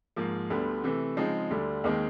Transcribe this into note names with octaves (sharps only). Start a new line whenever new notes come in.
G#2 F3 A#3
D2 D3 G3 B3
C3 E3 A3
C#3 F3 G#3 C4 D#4
D2 D3 G3
D#2 D#3 G#3 C4